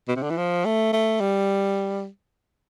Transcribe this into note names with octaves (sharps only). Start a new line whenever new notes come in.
B2
C3
D3
E3
F3
A3
A3
G3